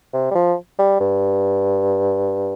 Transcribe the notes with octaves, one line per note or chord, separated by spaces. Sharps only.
C3
G3
F3
G3
G2